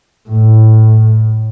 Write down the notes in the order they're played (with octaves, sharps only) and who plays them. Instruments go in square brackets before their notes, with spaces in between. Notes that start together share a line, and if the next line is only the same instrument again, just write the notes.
[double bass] A2